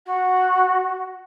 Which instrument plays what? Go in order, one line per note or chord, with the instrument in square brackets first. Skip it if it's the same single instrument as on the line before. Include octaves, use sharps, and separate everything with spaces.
[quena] F#4